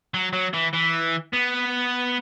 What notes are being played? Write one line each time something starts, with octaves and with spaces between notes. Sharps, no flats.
F#3
F#3
E3
E3
B3